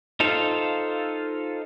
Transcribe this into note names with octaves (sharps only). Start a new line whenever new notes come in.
D#4 F4 A4 C5 F5